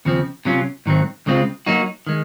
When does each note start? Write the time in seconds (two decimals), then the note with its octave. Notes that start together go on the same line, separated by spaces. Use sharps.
0.05 D#2 C#3 F3 C4
0.45 C3 F#3 C#4 F4
0.86 G#2 D#3 F#3 C4
1.26 C#2 C#3 G#3 C4 F4
1.66 F#3 A#3 D#4 F#4
2.07 D#3 G#3